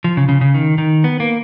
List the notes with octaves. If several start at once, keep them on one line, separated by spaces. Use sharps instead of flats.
F3
C#3
C#3
C#3
D#3
D#3
B3
A#3